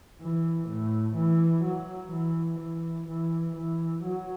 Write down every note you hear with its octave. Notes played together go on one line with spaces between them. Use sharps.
E3
A2
E3
F#3
E3
E3
E3
E3
F#3